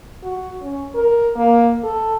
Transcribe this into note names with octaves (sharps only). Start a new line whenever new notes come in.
F#4
C#4
A#4
A#3
A4